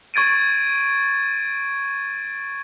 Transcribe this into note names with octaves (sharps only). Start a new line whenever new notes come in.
C#6 G#6 A6 D7 D#7